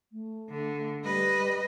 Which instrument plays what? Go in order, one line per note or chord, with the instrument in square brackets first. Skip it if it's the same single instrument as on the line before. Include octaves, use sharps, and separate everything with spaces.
[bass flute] A3
[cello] D3
[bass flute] G3 [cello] B4 D#5